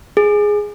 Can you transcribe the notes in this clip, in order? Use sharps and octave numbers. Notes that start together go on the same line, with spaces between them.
G#4